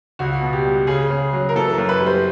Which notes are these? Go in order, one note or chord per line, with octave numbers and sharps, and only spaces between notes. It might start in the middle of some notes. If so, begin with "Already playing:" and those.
C#2 F#4
B2
G4
G3
C#3 G#4
C#3
F#3
A#4
E3 A4
F#2 A#4
B4
G3
C5